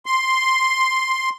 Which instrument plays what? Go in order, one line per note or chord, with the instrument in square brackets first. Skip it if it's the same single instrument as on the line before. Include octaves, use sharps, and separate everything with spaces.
[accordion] C6